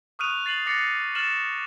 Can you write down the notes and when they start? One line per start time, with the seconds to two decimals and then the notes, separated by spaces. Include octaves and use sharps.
0.19 C#6 D#6 F6 F#6 D#7 F7
0.46 A6 C7 D#7 F#7
0.66 D6 F#6 A6 A#6 C7 C#7
1.15 F6 A6 E7 F#7